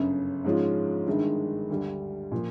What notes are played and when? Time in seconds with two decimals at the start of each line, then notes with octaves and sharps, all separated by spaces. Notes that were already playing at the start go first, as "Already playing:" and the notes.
Already playing: G1 F#2 C#3
0.45 G#2 F3 G#3 C#4 F4
1.07 G1 G2 D#3 G#3
1.70 D2 D3 G3
2.32 A#2 F3